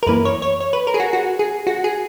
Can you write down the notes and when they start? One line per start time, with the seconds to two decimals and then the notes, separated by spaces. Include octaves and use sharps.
0.03 A#4
0.07 F#2 E3 A#3 B4
0.25 C#5
0.42 C#5
0.61 C#5
0.73 B4
0.87 A#4
0.94 G#4
1.00 F#4
1.13 F#4
1.39 G#4
1.67 F#4
1.84 G#4